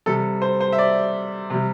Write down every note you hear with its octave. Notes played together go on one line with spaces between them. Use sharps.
C3 G3 A4
C5
C5
E5
D5
C3 G3